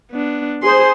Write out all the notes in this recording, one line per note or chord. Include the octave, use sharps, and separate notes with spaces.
B3 D4
G#4 C5 C6